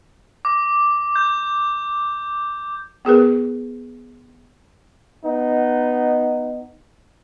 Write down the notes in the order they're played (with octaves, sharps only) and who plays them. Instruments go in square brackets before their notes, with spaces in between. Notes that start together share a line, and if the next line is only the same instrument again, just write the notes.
[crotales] D6
G6
[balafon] B3 G#4 A#4 B4
[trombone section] B3 D#4